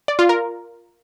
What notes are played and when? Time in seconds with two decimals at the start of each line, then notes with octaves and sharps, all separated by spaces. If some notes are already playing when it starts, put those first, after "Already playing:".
0.08 D5
0.19 F4
0.29 A#4